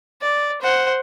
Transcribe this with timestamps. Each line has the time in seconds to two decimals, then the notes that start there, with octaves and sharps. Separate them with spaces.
0.22 D5
0.61 C5 F#5